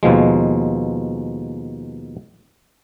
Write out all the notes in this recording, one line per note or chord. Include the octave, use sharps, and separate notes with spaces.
D#2 B2 F3 G#3